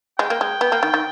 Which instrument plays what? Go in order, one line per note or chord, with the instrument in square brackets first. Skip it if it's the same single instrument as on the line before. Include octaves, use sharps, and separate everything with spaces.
[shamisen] G#3 [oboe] G5
[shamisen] A#3
G#3
B3
A#3
D#3
D#3